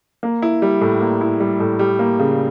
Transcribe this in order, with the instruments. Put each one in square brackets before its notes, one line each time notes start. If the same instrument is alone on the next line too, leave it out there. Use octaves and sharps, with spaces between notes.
[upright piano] A#3
E4
G3
A2
A#3
E4
G3
A2
G3
A#3
C#3